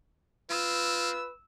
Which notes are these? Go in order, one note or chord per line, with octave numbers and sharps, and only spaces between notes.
C4 F4 B4 E6